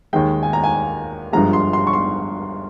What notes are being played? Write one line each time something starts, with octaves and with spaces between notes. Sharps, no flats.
D#2 D#3 G#3 G5
G#5
A#5
G#5
G1 G2 F3 G#3 A#5
C6
C6
C#6
C6